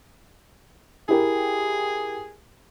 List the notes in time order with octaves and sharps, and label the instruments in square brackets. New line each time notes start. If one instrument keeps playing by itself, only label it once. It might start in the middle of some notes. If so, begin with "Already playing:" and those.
[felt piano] E4 G4 A#4 [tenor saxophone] G#4